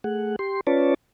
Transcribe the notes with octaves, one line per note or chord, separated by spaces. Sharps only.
A3 G#4 F#5
G4 C6
C#4 F4 B4 C#5 D5 A5